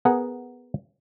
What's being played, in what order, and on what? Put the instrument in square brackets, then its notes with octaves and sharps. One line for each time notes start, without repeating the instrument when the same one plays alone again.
[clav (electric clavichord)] B3 G#4 A#4 F#5